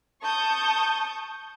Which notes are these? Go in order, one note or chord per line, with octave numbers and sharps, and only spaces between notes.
A5 C#6 D#6 G6